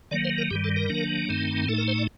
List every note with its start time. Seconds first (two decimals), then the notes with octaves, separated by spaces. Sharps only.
0.11 D#3 F#3 A#3 D5
0.25 C5
0.38 A#4
0.51 G2 D#3 G3 G4
0.64 A4
0.76 A#4
0.90 D#3 F#3 A#3 D4
1.29 G2 D#3 A3 C4 D#4
1.68 A2 A3 D#4 A4
1.78 A#4
1.88 C5
1.98 D5